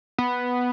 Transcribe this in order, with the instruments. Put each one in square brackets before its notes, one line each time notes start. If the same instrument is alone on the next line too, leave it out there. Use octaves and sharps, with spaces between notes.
[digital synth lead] B3